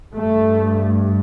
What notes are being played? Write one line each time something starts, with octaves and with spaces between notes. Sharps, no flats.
G2 A3